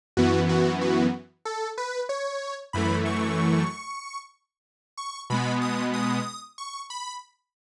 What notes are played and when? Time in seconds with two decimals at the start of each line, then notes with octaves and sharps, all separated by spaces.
0.17 F#2 E3 B3 F#4
0.49 F#4
0.81 F#4
1.45 A4
1.78 B4
2.09 C#5
2.73 F#2 E3 A3 B5
3.05 C#6
4.97 C#6
5.30 B2 G#3 B3 B5
5.62 D#6
5.94 D#6
6.58 C#6
6.90 B5